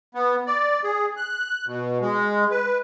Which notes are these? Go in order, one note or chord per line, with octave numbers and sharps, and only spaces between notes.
B3
D5
G#4
F#6
B2
G#3
B4